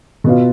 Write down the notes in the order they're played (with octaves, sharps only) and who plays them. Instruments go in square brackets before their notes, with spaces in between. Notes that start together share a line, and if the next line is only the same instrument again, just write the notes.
[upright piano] B2 B3 F4